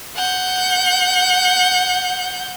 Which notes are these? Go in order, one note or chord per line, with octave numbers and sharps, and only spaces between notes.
F#5 G6